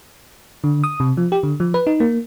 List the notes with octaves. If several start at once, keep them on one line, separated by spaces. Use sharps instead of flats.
D3
D#6
C3
F3
G4
D3
F3
B4
D#4
A#3